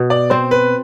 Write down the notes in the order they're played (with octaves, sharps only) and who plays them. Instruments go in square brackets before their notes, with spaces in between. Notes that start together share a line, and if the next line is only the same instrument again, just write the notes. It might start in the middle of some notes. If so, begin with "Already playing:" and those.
Already playing: [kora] B2
[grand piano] D5
[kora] C4 [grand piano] C5
[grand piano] B4